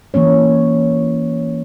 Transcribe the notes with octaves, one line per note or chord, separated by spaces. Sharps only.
E3 A#3 C#4 C#5